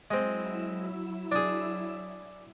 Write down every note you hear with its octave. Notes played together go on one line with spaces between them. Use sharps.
F#3 G#3 C4 E4 E6
D4 G#4